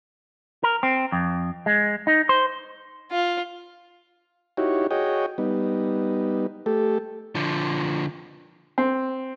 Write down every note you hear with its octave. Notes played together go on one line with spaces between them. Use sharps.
A#4
C4
F2
G#3
D#4
C5
F4
D#4 E4 F#4 G4 C#5
F#4 G#4 C#5 D#5 G5
G3 B3 D#4
A3 G4 A4
D3 F3
C4